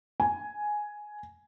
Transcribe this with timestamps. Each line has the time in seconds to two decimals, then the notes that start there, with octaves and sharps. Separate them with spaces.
0.20 G#5